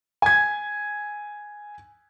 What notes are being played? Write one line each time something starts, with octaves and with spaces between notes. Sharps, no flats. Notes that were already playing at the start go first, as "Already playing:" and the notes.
G#5 G#6